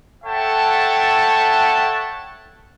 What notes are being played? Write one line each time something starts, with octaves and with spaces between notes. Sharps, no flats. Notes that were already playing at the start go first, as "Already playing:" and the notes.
A4 C#5 E5 F#5 G5 A5